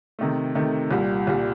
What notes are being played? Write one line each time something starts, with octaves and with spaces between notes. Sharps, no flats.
C3 D#3 A3
C3 D#3 A3
C2 A#2 G3
C2 A#2 G3